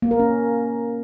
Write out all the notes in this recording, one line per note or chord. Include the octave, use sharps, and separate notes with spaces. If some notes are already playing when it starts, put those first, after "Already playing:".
A#3
A#4
C#4